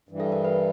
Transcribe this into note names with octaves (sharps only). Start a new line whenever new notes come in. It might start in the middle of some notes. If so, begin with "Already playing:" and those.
G2 E3 G3
A4
A#4
B4